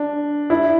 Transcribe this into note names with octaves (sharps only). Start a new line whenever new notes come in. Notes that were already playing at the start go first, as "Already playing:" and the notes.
Already playing: D4
E4